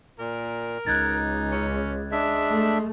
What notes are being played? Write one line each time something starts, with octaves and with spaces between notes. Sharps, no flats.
A#2 A#4
C#2 D#4 F#6 G#6 A6
C#4
G#3 D4 E5
A3